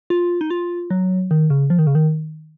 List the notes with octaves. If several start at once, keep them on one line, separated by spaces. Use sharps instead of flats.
F4
D#4
F4
F#3
D#3
C#3
F3
D#3
C#3
D#3